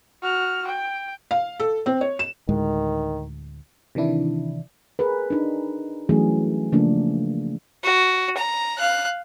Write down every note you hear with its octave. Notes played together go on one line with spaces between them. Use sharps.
F#4 F6
G5
F5
A4
C4
C#5
E7
D2 A2 D#3 G#3
C3 D#3 E3 D4 E4
G#4 A#4 B4
D4 D#4
E3 F#3 G3 A3 C#4 G#4
C#3 F3 A3 A#3 D4
F#4
A#5
F5 F#6